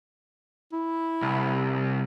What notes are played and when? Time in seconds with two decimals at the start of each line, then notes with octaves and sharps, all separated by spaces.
0.73 E4
1.22 C2